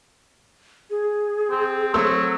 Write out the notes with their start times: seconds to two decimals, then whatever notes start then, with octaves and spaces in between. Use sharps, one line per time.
0.90 G#4
1.51 C4
1.94 F#3 A3 C4 E6